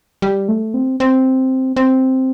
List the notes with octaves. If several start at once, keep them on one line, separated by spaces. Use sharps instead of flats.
G3
A3
C4
C4
C4